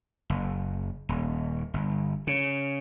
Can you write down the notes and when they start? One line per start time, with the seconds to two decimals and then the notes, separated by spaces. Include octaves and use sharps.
0.30 F#1
1.09 D#1
1.74 G1
2.27 C#3